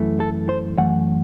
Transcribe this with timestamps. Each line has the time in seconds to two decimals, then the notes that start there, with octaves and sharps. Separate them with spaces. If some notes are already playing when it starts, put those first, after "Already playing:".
Already playing: F#2 E3 A3
0.20 A4
0.49 C5
0.78 F#2 E3 A3 F#5